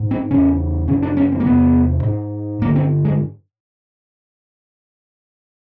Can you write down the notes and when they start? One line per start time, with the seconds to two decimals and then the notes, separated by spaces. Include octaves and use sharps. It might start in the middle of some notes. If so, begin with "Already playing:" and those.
Already playing: G#2
0.11 C4
0.31 E2 C#3 C#4
0.88 C#3 C#4
0.92 F#2
1.02 D4
1.17 C#4
1.32 C4
1.40 A#3
1.46 E2 C3 B3
2.03 G#2
2.62 G2 A#3
2.65 D3
2.76 C4
3.05 G#3